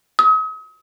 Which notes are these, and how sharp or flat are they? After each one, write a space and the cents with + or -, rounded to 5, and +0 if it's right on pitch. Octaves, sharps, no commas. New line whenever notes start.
D#6 +40